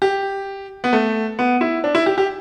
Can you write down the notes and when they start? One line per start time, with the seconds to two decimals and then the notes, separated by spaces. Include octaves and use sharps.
0.02 G4
0.84 B3
0.93 A3
1.39 B3
1.61 E4
1.84 D4
1.95 E4
2.06 G4
2.18 G4